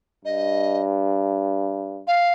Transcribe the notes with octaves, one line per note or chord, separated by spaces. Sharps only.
G2 D#5
F5